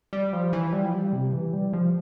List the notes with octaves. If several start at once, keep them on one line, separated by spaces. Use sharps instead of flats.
G3
F3
E3
G3
F3
G3
C3
E3
G3
F3